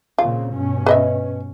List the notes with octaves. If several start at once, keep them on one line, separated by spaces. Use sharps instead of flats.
A#2 C#3 C4 F4
G2 B2 C#4
B4 D#5 E5